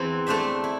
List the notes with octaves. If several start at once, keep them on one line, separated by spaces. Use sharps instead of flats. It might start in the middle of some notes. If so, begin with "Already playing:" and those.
Already playing: E2 E3 C4 E4
A3 D4 C5 E5
E4